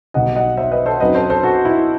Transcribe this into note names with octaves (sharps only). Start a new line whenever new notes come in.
B1 B2 G3 D#4 D#5 F#5
D#5 F#5
C5 E5
B4 D#5
A4 C5
F#2 F#3 C4 D#4 B4 D#5
A4 C5
A4 C5
F#4 A4
E4